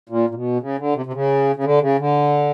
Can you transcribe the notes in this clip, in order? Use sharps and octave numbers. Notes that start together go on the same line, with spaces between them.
A#2
A#2
B2
C#3
D3
C3
C3
C#3
C#3
D3
C#3
D3